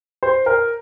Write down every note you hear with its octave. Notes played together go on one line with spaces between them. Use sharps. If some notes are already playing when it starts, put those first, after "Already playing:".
C5
A#4